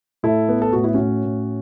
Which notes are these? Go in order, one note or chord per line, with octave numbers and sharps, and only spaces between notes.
A2 E4 A4
B3
A4
A2 F#4
E4
C#4 F#4
A2
A2